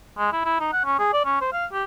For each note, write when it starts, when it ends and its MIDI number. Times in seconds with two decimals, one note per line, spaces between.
0.18 0.32 56
0.32 0.41 64
0.45 0.58 64
0.60 0.72 63
0.72 0.82 78
0.85 0.96 61
0.99 1.09 68
1.13 1.22 74
1.25 1.40 61
1.41 1.48 72
1.53 1.66 77
1.72 1.84 67